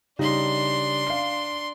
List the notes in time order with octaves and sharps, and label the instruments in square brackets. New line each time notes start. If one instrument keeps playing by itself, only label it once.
[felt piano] C#3 G3 D#4 [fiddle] D4 C6
[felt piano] F5 C7